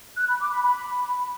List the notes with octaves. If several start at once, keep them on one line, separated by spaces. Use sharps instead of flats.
F#6
B5
D6
B5
B5